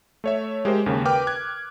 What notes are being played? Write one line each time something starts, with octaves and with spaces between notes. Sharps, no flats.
A3 C#5 E5
G#3 G4 A#4 C5
D#2 C#3 A#3
A#4 B4 G5 D6 F6
F#6 G#6